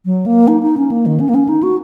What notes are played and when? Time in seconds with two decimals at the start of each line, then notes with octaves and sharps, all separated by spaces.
0.05 F#3
0.26 A#3
0.48 D#4
0.62 D#4
0.77 C#4
0.91 A#3
1.06 D#3
1.20 C#4
1.29 A#3
1.35 C#4
1.49 D#4
1.63 F#4